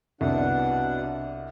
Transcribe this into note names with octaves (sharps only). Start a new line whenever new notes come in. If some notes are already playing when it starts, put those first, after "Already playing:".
C2 B2 D4 F#5